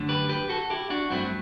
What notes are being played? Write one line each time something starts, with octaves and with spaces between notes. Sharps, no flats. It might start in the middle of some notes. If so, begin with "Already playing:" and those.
Already playing: F#2 D3 A3
G4 B4
G4 B4
F#4 A4
E4 G4
D4 F#4
G2 F#3 A3 C4 E4